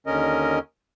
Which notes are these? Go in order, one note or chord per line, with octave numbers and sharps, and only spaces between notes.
D#2 D3 C#4 A#4 D#5